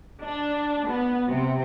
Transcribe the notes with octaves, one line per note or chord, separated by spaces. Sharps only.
D4
B3
C3